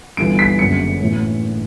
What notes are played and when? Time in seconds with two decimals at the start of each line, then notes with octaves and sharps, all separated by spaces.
0.17 G1 G2 E3 D7
0.39 B6
0.59 F#1 F#2 D3 C#7
1.01 A2 E3